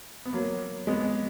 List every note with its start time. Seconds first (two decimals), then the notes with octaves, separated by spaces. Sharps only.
0.25 B3
0.33 F#3 A#3
0.87 G#3 B3